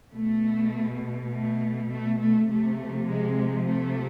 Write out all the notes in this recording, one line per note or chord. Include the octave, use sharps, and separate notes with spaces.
B2 A3
A3
A3
A3
C3 F3 A3
G#3
A3